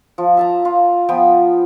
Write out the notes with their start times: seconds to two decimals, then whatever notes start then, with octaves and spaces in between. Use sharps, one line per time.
0.18 F3
0.37 E5 A5 A#5
0.65 F4
1.09 F3 B3 G5 D#6